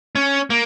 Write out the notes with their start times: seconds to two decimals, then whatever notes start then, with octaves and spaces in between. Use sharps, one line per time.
0.15 C#4
0.50 A#3